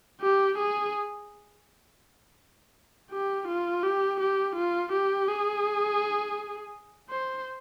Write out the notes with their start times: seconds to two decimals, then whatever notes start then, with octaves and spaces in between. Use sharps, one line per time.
0.21 G4
0.58 G#4
3.11 G4
3.48 F4
3.83 G4
4.20 G4
4.56 F4
4.92 G4
5.28 G#4
7.09 C5